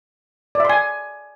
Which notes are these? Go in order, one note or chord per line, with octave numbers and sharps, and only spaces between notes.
D5 E5 G#5 C6